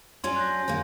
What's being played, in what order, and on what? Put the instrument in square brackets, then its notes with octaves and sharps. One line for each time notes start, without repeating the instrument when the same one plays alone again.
[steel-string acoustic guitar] F#3 C#4 D4 [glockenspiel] G#5 C6
[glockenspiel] F#6 G6 A#6
[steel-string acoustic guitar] F#2 D#3 A#3